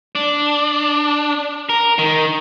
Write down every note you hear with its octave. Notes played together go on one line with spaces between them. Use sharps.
D4
A#4
D#3